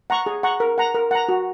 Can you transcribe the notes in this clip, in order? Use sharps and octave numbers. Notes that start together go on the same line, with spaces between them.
F#5 A#5 C#6
G#4
F#5 A#5 C#6
A#4
F#5 A#5
A#4
F#5 A#5
F#4